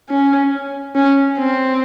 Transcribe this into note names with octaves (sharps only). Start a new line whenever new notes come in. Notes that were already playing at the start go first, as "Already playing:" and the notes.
C#4
C#4
C4